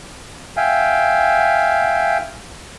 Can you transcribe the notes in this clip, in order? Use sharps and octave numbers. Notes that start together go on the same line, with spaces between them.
E5 F5 G5 G#5